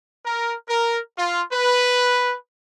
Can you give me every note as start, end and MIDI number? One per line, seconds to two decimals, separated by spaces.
0.25 0.54 70
0.68 0.99 70
1.18 1.42 65
1.53 2.36 71